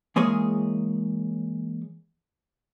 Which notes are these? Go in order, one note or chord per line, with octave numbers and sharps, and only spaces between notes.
E3 G#3 A#3 G#4 C#5